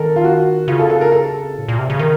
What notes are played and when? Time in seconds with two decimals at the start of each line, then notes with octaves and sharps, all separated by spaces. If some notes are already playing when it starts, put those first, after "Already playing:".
Already playing: D#3 A4 A#4
0.16 F4
0.24 F#4
0.68 C#3 F4
0.79 A4
0.90 A4
1.01 A#4
1.12 A4
1.58 A2
1.68 A#2
1.79 C3
1.90 C#3
1.99 D#3 A#4